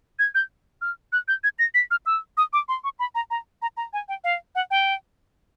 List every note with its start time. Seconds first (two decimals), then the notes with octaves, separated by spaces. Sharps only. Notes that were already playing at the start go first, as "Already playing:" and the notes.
0.19 G#6
0.35 G6
0.81 F6
1.13 F#6
1.28 G6
1.44 G#6
1.59 A#6
1.74 B6
1.91 F6
2.06 E6
2.37 D#6
2.53 D6
2.69 C6
2.84 C#6
2.99 B5
3.15 A#5
3.31 A#5
3.62 A#5
3.77 A#5
3.93 G#5
4.09 G5
4.24 F5
4.55 F#5
4.71 G5